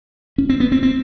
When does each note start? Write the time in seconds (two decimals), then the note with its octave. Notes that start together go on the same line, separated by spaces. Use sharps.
0.38 C#4
0.49 C4
0.60 B3
0.72 C4
0.83 C4